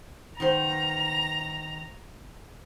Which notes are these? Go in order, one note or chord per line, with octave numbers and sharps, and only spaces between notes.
D#3 B3 C5 A#5